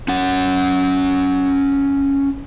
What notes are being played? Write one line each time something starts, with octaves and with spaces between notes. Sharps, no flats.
C#4 F#5